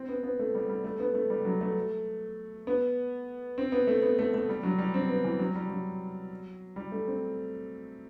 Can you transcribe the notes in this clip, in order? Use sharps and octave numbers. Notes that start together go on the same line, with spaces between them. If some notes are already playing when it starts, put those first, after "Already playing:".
Already playing: C4
B3
B3
A3
G3
G3
A3
B3
A3
G3
F#3
A3
B3
C4
B3
A3
B3
A3
A3
G3
F#3
G3
C4
B3
E3
F#3
G3
F#3
G3
A3
C4